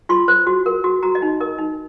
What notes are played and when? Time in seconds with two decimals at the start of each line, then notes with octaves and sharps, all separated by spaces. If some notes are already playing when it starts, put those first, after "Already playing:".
0.09 F4 C6
0.28 C5
0.47 F#4
0.66 A#4
0.84 F#4
1.03 F#4 A#5
1.15 D#5
1.22 D#4
1.41 A#4 D#5
1.58 D#4